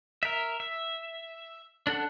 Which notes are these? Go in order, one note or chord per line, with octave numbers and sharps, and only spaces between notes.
A#4 E5
E5
D4 A4 F#5